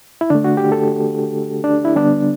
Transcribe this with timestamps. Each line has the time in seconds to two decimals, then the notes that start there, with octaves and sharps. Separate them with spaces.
0.21 E4
0.30 D3 A3 D4
0.44 F#4
0.57 G4
0.72 A4
1.64 D4
1.85 E4
1.95 D3 G3 B3 D4